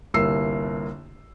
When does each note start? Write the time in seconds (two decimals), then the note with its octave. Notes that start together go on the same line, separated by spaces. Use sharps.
0.14 G1 C2 A#3 E6 C7